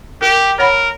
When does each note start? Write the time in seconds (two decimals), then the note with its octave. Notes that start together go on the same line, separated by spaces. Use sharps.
0.22 G4 A#4
0.59 A#4 C#5 F#5 B5